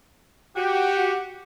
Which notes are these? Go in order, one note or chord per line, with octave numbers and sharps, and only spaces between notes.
F#4 G4